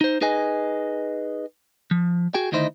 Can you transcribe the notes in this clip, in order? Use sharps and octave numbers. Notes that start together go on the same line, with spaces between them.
D#4 C5
D#4 G#4 B4 D#5 G#5
F3
F#4 G#4 G5
D2 D#3 D#4 E4 C5 D#5